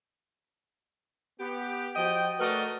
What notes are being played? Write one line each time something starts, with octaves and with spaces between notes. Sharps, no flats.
B3 G4
F3 F#4 D#5 G5
A3 F#4 A#4 B4 D5 D#5